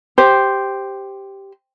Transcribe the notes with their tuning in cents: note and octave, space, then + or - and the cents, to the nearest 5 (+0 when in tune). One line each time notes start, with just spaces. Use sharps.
G4 +0 C5 +0